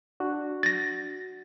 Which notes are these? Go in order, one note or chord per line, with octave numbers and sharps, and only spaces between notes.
D4 F#4
A6 A#6